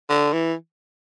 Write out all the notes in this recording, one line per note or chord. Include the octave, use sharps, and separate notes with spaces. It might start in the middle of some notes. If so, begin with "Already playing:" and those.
D3
E3